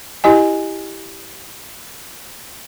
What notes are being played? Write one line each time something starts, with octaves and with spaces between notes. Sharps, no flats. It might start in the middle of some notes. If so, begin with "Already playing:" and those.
E4 G4 D#5 G#5